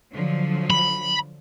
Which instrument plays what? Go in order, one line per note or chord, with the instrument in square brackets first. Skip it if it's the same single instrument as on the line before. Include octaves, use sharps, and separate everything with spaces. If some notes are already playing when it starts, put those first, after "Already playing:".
[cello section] D3 F3 F#3
[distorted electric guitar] B5